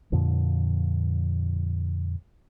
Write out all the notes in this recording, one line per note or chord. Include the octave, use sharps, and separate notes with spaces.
F2 A#2 D3 F3